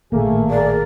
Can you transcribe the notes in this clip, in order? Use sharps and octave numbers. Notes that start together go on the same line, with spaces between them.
A1 A#2 D#3 A3 A#3 G#4
G#4 A#4 D5